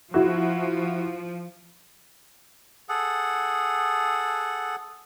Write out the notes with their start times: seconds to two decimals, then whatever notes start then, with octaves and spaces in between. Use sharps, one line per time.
0.14 F3 E4 F#4
2.89 G#4 A4 F#5